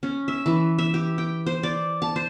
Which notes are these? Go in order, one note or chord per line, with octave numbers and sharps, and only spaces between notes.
C#4
E5
E3
E5
G4
G5
C5
D5
A5
C5